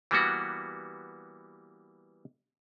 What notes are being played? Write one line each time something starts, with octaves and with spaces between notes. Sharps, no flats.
E3 G3 A#3 B3 F#4